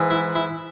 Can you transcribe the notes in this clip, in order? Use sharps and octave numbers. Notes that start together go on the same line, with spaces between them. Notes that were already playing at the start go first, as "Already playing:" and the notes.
Already playing: G#2 E3
E4
E4